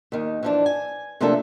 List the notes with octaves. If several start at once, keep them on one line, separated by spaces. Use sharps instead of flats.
D#2 D#3
E3 F3 D4
G#5
C3 F3 A3 A#3 D4 A4